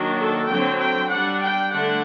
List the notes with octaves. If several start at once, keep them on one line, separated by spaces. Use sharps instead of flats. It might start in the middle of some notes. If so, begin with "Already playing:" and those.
Already playing: D#3 F#3 A#3 D4
A4
D3 F#3 C4 G5
G5
G3 D4 F#5
G5
D3 A3 D4 F#5